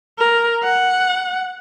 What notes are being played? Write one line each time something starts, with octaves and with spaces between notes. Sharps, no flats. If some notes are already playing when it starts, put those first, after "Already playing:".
A#4
F#5